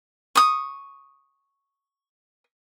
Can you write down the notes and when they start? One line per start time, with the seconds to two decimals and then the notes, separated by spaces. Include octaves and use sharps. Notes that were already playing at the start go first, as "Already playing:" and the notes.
0.35 C#6 D#6